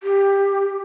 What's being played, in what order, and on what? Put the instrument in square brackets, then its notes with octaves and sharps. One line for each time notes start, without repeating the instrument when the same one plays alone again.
[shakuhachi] G4